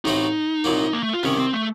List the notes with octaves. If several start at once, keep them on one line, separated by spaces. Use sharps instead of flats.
A1 A2 A3 C4 D#4 F#4
C2 A#2 F#3 A#3
A#3
A3
F4
C2 C3 D#3 C#4
C4
A3